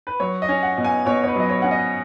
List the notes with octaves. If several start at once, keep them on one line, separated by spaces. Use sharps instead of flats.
B4
F#3 C#5
D#5
C#4
F#5
B2
G#5
B2 C#5
C#5
B4
F#3 D#5
C#5
C#4 F#5
D#5